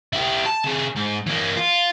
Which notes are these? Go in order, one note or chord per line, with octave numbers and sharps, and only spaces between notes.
E4 G4
A5
C3 G#4
G#2
E3 A#3
F4